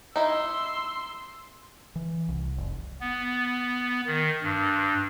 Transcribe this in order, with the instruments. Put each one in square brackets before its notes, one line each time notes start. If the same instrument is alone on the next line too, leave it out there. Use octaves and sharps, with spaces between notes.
[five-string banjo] D#4 E4 [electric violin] C6 E6
[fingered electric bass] E3
C2
F1
[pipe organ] B3
D#3
G2